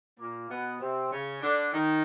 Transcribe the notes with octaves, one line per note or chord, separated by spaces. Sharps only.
A#2 A#3
B2 B3
C3 C4
C#3 C#4
D3 D4
D#3 D#4